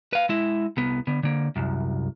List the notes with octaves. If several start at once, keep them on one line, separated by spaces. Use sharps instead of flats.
B4 F5
G#3 E4
C2 B3
D3 B3
D3 A#3
C2 F#2